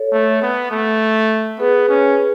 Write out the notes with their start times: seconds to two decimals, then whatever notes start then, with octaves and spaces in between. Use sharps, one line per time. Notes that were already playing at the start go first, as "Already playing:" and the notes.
Already playing: A4 C#5
0.12 A3
0.42 B3
0.71 A3
1.59 B3 G#4 B4
1.89 C#4